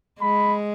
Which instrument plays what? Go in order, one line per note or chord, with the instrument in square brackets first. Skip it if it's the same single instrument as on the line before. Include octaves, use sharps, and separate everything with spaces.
[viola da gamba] G#3 [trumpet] B5